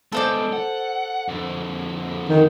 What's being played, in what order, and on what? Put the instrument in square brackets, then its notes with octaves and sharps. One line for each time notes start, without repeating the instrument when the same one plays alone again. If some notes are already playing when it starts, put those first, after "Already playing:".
[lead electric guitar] G#3 B3 [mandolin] A4 C5 D5
[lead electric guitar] F#5
F2 D3
[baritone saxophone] D#3